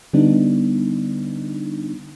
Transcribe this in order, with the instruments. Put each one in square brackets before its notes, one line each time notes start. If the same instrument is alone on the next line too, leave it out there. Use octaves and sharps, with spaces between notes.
[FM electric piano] D3 G3 B3 D4 D#4